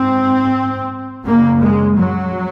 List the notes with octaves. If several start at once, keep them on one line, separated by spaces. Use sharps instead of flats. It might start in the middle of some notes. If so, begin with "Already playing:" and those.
Already playing: G#2 C4
F#2 C#3 A#3
G#3
F#3